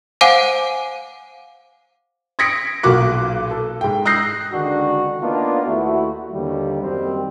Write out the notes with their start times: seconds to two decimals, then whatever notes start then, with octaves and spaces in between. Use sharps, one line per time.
0.21 C5 F5 F#5 G#5 D6 D#7
2.39 D#6 G#6 A#6 B6 C#7 D7
2.83 B1 A#2 A#3 F#4 D6 F#6
3.51 A4
3.81 G#2 G5
4.05 D#6 E6 F#6 G6 A#6 C7
4.53 C#2 D3 D#3 D4 F#4
5.22 A#3 B3 D4 D#4 F4
5.65 D#2 A3 E4 F#4
6.33 D#2 D3 G3
6.82 F#2 D#3 G3 C4